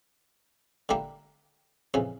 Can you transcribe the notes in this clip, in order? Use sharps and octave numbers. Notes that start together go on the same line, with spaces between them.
D3 G3 A#3 E4 G4
F2 C#3 E3